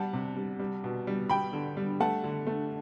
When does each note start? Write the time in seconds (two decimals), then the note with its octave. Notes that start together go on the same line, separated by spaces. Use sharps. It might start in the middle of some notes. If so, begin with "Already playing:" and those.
Already playing: G3 F#5 A5
0.13 C3
0.36 G3
0.59 G3
0.84 B2
1.07 G3
1.30 G3 G5 B5
1.53 D3
1.77 G3
2.00 A3 F#5 A5
2.24 D3
2.47 A3